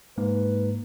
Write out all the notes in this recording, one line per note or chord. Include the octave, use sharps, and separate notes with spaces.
G#2 A#3 B4